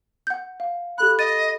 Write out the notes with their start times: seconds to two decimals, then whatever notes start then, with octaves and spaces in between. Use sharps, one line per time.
0.27 F#5 G6
0.60 F5
0.98 G4 A4 B5 F#6
1.19 D#5 A6 D#7